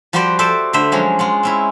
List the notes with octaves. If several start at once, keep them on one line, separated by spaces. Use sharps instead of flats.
F3 G3 F#4 G4 C5 D5
A4 C5 D5 E5 A5
D3 A3 C5 E5 B5
F3 F#3 G#3 C#4
G#3 F4 F#5
C4 C#4 E4